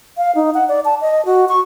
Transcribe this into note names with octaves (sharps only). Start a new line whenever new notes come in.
F5
D#4
F#5
D5
A5
D#5
F#4
C#6